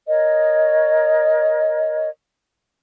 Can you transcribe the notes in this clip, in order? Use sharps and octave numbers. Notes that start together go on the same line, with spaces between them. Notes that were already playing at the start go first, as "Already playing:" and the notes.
A#4 C#5 D#5